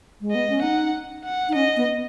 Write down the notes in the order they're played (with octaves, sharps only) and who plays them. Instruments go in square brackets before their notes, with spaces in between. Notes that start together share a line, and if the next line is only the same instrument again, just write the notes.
[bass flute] G#3
[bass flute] B3 [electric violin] D#5
[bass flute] C#4
[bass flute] D#4 [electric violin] F#5
[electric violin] F#5
[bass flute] D#4
[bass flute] C#4 [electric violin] D#5
[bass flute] B3